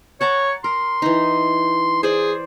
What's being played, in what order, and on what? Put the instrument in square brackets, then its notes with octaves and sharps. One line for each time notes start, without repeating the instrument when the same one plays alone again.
[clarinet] C#5 [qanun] F#5 A5 A#5
[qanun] A#4 [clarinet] C6
[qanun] E3 D#4
[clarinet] G#4 [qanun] C5 D5